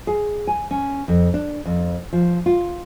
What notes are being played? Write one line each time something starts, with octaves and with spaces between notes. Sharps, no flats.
G#4
G#5
C#4
F2
D4
F2
F3
F4